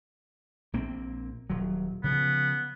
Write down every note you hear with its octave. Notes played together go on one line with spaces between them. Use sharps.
A#1 A#3 C4
D#1 F#3
C#3 F3 B3